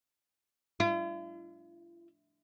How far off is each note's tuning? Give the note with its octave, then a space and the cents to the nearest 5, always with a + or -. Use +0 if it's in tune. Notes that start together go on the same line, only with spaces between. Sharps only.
F4 -45